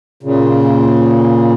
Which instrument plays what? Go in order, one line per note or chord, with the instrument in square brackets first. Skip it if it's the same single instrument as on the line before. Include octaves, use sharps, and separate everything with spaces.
[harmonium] A#2 C#3